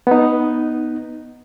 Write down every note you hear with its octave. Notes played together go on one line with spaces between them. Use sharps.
B3 D#4